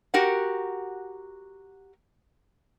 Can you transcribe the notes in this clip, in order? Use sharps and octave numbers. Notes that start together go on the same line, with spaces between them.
F#4 G4 A#4 F#5